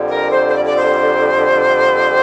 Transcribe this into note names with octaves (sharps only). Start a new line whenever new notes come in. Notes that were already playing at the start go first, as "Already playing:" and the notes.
Already playing: F2 D3 G3
A#4
C5
C5
D5
D5
C5